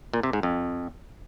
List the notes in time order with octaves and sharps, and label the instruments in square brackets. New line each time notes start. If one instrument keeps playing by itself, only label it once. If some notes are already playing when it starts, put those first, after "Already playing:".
[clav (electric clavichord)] A#2
C3
G#2
F2